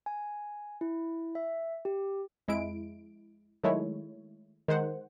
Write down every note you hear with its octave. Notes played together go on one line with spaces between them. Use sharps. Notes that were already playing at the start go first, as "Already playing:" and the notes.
G#5
E4
E5
G4
F2 G#3 E4 D7
D#3 F#3 G#3 A3 E4 C#5
D#3 G#3 C5 F#5